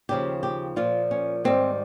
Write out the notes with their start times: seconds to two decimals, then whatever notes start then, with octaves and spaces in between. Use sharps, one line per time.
0.09 D#2 C#3 F3 G4
0.43 G4
0.76 A#2 F3 F4
1.11 C#4
1.44 G#2 D#3 G3 C4